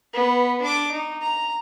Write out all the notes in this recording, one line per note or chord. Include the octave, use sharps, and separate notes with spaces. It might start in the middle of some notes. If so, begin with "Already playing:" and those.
B3 B4
D4 D6
D#4
A#5